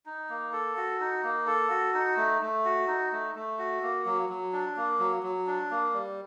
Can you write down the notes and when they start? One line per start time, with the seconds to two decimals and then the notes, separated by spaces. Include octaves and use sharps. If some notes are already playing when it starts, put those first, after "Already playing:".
0.06 D#4
0.29 A#3
0.53 A4
0.77 F#4
1.00 D#4
1.24 A#3
1.47 A4
1.70 F#4
1.94 D#4
2.17 A3
2.42 A3
2.65 F#4
2.88 D#4
3.12 A3
3.35 A3
3.59 F#4
3.82 A#3
4.06 F#3
4.29 F#3
4.53 D4
4.77 A#3
4.99 F#3
5.23 F#3
5.47 D4
5.71 A#3
5.93 G3